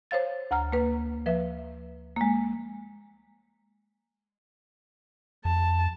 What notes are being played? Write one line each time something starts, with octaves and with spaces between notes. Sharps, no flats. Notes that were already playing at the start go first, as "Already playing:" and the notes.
C5 C#5 F5 A6
D2 F#5 A#5 F6
A#3 B4
F3 B4 E5
G#3 A#3
F2 A5